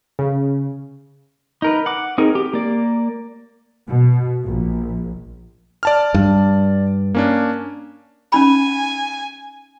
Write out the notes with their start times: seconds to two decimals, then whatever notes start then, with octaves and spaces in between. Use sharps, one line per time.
0.19 C#3
1.62 D#4 A#4 B4
1.86 F#5 D6
2.18 C4 D#4 G#4 A#4
2.35 G4
2.53 A#3 D5
3.87 B2
4.44 A#1
5.83 D5 A5 F6
6.14 G2
7.15 A#3 C#4 D4
8.32 C#4 D#4 G#5 B5